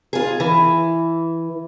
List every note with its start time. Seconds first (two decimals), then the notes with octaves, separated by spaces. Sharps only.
0.13 F4 G#4
0.40 E3